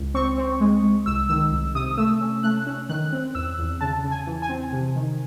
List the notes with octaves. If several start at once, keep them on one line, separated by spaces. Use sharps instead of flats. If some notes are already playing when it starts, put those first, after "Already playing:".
Already playing: C#2
C4 C#6
C4
G#3
G#3
C2 E6
D#3 E6
C2
C3 D#6
A3 E6
C#4
A3 F#6
C#4
D#3 F#6
C4
E2 E6
E2
C#3 A5
C#3
G#5
E3
G#5
C4
C3
D#3